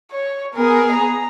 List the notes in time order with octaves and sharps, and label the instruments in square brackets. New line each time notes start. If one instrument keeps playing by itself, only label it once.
[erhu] C#5
[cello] B3 G#4 [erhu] A#4
[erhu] A#5